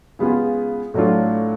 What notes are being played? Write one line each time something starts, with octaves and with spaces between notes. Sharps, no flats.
C#3 G#3 B3 F4 G#4
A2 F#3 A3 D4 F4